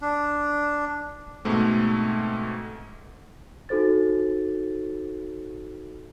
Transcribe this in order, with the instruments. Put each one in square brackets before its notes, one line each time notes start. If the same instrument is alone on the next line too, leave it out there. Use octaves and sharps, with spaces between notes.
[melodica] D4
[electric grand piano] G#2 B2 A3 C4
[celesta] D#4 F#4 A4 C5 A6